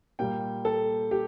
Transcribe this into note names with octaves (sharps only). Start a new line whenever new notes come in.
A#2 G3 A#3 G5
A4
G4